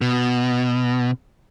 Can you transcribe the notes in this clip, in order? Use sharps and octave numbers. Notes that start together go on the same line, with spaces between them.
B2